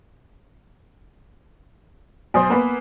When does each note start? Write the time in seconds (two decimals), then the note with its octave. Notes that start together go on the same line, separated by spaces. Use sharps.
2.34 B1 C5 G#5 C6 D#6
2.50 A#3 B3 B4